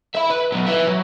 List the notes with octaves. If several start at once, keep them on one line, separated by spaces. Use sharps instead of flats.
E5 B5
B4
F#3 B3
B4 E5
F#3